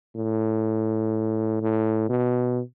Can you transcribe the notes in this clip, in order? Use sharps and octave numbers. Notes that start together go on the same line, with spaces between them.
A2
A2
B2